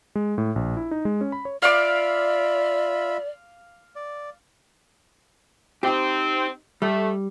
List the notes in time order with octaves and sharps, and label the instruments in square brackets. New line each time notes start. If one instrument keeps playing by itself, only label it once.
[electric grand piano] G#3
A2
A#1
E4
D#4
G#3
C#4
B5
C#5
[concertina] F4 E5 B5 [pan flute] D5 [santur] F5 D6
[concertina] D5
[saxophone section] C4 [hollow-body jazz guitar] D#4 G4
[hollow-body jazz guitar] G3 [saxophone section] A3